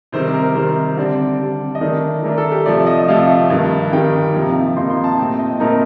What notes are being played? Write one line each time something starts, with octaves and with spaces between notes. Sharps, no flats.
C3 D#3 G3 C5
A#4
C3 D#3 G3 C5
D3 G3 C4 D5
D3 G3 C4
D#5
D#3 A3 D4 D5
D#3 A3 D4 A#4
A4
G4
C3 F3 A3 D5
D#5
C3 F3 A3 F5
G2 D#3 G3
G2 D#3 G3 G5
F2 C3 F3 A#3 D#4
F2 C3 F3 A#3 D#4 C6
C6
A5
A#2 A3 C4 D#4 G5
D#5
A#2 A3 C4 D#4 A#4